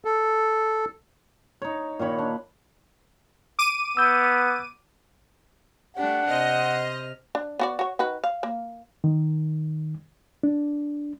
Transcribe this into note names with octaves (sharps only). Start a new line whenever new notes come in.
A4
D#4 C#5
A#2 D#3 C#5 B5
D4
D6 D#7
B3 E6 G6
A3 D4 G4 F#5
C3 C5 D#5 F6
D4
B3 F#4 D5
F#4 C#5
D#3 F#4 B4
F5
A#3
D#3
D4